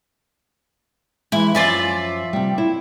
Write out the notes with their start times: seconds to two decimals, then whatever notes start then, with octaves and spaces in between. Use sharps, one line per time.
1.32 E3 G#3 E4
1.55 F#2 F3 F4 D5 E5 G#5
2.33 C3 G3
2.58 E4